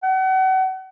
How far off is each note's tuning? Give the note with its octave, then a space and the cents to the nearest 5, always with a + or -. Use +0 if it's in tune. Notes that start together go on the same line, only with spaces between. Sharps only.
F#5 +35